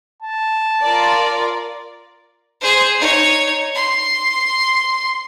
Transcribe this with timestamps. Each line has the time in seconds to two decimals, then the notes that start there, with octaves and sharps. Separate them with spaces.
0.22 A5
0.83 F4 A#4 D5
2.61 G#4 C5
3.00 D#4 C#5
3.75 C6